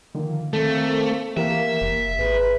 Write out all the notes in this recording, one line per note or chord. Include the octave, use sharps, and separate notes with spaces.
D3 D#3 F3 A#3
D#3 A3 A#3 C4 A4
E3 A#3 G4 A#4 E5 F5
F1
G#1 G#4 B4